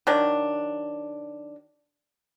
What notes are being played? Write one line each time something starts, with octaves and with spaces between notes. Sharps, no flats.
D#3 F#3 D4